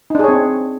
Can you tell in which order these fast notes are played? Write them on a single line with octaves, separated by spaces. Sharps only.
D#4 D4 G#4 C#5 C4